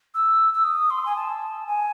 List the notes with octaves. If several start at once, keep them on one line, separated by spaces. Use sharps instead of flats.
E6
E6
D#6
C6
G#5
A5
G#5